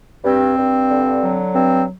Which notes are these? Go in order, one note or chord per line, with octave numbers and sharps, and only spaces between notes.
G2 C4
G2
D3
F#3
G2 C4